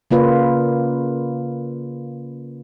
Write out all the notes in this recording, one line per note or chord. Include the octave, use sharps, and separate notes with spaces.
C#3 A#3 F4 B4 D5